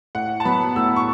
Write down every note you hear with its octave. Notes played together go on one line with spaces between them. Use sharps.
A2 F#5
A5
F#3 B3 B5
A2 E6
C#6